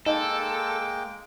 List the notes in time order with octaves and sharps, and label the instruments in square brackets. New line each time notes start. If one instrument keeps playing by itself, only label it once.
[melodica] G#3 A#3 G5 [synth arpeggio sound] D#4 [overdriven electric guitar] A4